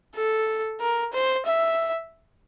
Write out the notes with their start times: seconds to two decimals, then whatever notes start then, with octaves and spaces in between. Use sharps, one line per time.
0.16 A4
0.81 A#4
1.13 C5
1.46 E5